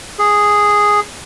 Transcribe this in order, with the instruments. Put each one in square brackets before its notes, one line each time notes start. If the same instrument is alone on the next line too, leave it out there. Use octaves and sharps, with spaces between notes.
[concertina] G#4